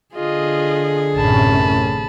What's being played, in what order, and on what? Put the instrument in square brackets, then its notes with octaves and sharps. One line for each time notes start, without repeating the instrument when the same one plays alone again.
[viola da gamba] D3 G#4 [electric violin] F4 D#5
[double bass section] A1 C3 C#4 [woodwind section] F#2 [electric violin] A5 B5